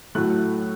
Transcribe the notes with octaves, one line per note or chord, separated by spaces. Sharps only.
A2 F#3 A3 F#6